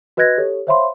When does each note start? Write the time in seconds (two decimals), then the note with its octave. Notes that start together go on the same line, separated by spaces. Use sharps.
0.17 F#4 B4 D#5 F#6 G#6 A#6
0.38 G4 A4 C#5
0.67 C5 C#5 E5 F5 B5 C6